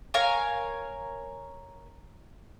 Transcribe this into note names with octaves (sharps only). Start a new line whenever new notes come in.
A#4 C#5 F5 G#5